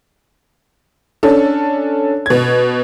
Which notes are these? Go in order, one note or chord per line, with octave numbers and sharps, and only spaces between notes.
C#4 D4 A4
B2 G#6